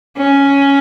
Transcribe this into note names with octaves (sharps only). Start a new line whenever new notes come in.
C#4